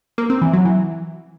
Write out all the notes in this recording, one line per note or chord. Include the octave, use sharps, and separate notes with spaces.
A#3
C4
E3
F#3
E3